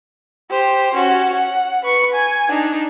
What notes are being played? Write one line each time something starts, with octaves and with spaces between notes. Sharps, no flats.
G4 C5
C#4 F#4
F#5
B4 C#6
G#5
D4 D#4